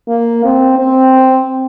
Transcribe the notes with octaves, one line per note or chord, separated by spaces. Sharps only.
A#3
C4
C4